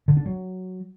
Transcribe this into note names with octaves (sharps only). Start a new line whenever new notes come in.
D3
D4
F#3